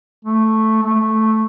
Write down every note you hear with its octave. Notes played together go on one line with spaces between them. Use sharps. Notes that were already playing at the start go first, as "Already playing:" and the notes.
A3
A3